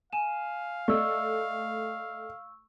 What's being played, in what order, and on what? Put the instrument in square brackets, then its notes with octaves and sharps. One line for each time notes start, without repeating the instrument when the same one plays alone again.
[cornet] F5 [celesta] G#5 D#7 E7
[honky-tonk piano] A3 [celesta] D5 D#5 [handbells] C#6 E6